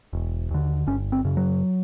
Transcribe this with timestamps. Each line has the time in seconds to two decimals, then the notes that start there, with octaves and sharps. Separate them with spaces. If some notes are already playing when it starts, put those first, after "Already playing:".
0.13 E1
0.51 D#2 D3
0.87 G1 C#4
1.12 C4
1.24 F#2 C#3
1.37 F#3